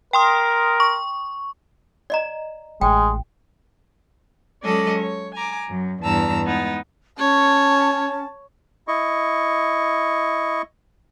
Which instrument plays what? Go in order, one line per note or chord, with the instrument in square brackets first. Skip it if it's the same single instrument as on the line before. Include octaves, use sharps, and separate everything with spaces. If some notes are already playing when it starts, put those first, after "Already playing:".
[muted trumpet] A#4 [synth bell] G5 C6 D#6
[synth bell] C#6
[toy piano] D5 D#5 A#5
[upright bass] A1 [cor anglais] G#3 [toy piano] G5
[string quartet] F#3 G#3 C#4 A4 D5 D#5
C#5
G#5 A#5 D6
F#2
E2 G2 A5 A#5 E6
G#3 B3 D#4
[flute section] C#4 [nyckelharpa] C#5 [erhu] A5
[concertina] E4 D#5 C#6